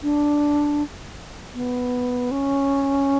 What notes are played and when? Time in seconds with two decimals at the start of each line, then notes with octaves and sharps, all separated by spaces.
0.03 D4
1.55 B3
2.31 C#4